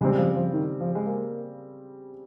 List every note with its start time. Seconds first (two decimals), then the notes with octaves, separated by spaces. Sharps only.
0.01 C#3 G3 G#3 C4
0.18 F3
0.35 F3
0.53 D#3
0.80 F3
0.95 G#3
1.06 A#3